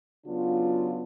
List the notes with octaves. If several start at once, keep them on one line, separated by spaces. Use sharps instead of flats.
C#3 F#3 B3 D4 F4